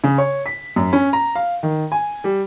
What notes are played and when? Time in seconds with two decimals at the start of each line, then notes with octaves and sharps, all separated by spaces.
0.04 C#3
0.18 C#5
0.46 B6
0.76 F#2
0.93 C#4
1.13 A#5
1.35 F5
1.63 D#3
1.92 G#5
2.24 G3